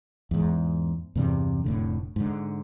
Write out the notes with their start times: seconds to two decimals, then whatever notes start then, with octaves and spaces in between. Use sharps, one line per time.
0.31 E2 G#2
1.15 E2 G2 C3 G3
1.64 F1 A2 D3
2.16 G#2 D3